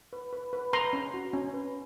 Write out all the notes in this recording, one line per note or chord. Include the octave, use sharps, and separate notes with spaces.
B4
B4
B4
B4 A#5 C6
C#4
F#4
C#4
B4